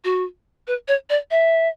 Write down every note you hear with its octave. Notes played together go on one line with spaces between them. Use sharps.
F#4
B4
C#5
D5
E5